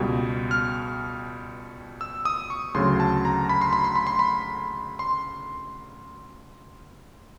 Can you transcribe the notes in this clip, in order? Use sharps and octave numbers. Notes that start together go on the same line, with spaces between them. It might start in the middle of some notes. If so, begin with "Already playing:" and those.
Already playing: C#2 B2 G3
F6
E6
D#6
C#6
D2 C#3 F#3 C6
A5
A#5
B5
C6
B5
C6
B5
C6
B5
C6